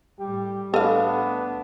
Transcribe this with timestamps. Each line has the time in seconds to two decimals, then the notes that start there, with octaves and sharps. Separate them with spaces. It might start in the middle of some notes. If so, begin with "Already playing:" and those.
0.20 A2 G3 G4
0.74 A3 B3 D4 A4 D#5 F5